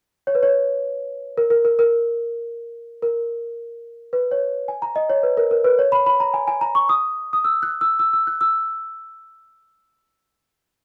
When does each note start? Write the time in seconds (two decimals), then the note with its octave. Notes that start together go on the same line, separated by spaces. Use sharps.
0.27 C#5
0.35 B4
0.43 C#5
1.37 A#4
1.50 A#4
1.65 A#4
1.79 A#4
3.02 A#4
4.13 B4
4.31 C#5
4.68 G#5
4.82 A#5
4.96 D#5
5.10 C#5
5.23 B4
5.37 A#4
5.51 A#4
5.64 B4
5.79 C#5
5.92 B5
6.06 B5
6.20 A#5
6.34 G#5
6.48 G#5
6.61 A#5
6.75 C#6
6.89 D#6
7.33 D#6
7.44 E6
7.63 F#6
7.81 E6
7.99 E6
8.13 E6
8.27 F#6
8.41 E6